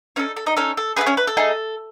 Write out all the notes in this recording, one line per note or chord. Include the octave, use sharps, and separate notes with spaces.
C#4 D#4 A4 C#5
A4
D#4 D#5
C#4 D#4 A4 C#5
A4
A3 D#4 G#4 B4
C#4 C#5
B4
A4
A3 D#4 G#4